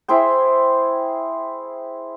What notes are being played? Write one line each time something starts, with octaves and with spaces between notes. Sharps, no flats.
E4 G#4 C5 G5